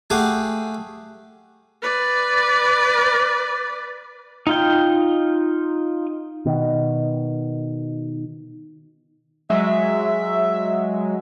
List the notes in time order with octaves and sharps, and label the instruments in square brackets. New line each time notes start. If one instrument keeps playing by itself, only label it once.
[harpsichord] A3 G4 G#4 F5 F#5 G#5
[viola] B4 D5
[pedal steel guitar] D#4 F4 G5
[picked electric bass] B2 D#3
[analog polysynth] F#3 G#3 [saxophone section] E5